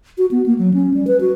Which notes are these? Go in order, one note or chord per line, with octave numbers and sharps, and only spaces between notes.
F#4
B3
A#3
F#3
C#4
G3
B4
F#4